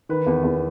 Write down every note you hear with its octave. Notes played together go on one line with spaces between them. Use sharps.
D#3 B4
E2
E2